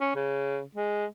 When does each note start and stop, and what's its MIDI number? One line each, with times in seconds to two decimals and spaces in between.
0.01 0.10 61
0.15 0.61 49
0.75 1.06 56